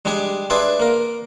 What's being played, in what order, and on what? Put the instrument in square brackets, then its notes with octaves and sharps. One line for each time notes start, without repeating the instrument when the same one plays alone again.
[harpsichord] G3 G#3 D4 G4 G#4
D4 G#4 B4 E5 A5 C6
A#3 A#4